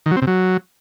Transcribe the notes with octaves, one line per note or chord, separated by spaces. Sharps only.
D#3
F#3
C4
C3
F#3